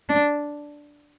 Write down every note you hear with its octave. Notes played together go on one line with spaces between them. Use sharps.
D4